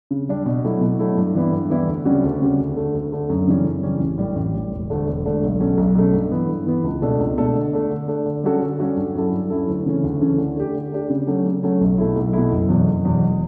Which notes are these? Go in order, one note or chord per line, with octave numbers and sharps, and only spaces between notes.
C#3
G3 D4
B2
F#3 A3 E4
B2
F#3 A3 E4
G2
E3 G3 B3 E4
G2
E3 G3 B3 E4
D2
C#3 G3 C#4 F#4
D2
C#3 G3 C#4 F#4
D2
D3 A3
D2
D3 A3
F#2
C#3 E3 G3 C#4
F#2
C#3 E3 G3 C#4
A1
A2 G3
A1
A2 G3
E1
D2 D3 A3 D4
E1
D2 D3 A3 D4
B1
B2 F#3 A3 C#4
B1
B2 F#3 A3 C#4
G2
E3 B3
G2
E3 B3
C#2
B2 A3 D4 A4
C#2
B2 A3 D4 A4
D3
A3 D4
D3
A3 D4
D3
G3 C#4 F#4 A4
D3
G3 C#4 F#4 A4
G2
F#3 C#4 E4 A4
G2
F#3 C#4 E4 A4
D2
C#3 E3 A3 C#4
D2
C#3 E3 A3 C#4
D3
A3 D4 G4
D3
A3 D4 G4
C#3
F#3 A3 C#4
C#3
F#3 A3 C#4
B1
B2 A3 E4
B1
B2 A3 E4
F#1
E2 B2 F#3
F#1
E2 B2 F#3
E1